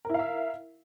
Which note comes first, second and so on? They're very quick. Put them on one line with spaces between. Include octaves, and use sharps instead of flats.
A#4 E4 F5 E5